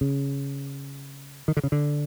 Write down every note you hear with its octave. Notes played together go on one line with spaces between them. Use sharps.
C#3
D#3
D3
C#3
D3